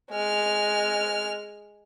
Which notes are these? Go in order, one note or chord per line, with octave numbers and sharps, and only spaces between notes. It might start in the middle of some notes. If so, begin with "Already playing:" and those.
G#3 F6